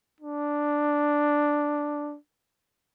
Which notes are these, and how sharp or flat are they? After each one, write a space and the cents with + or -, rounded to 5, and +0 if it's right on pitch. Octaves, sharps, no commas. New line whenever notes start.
D4 +0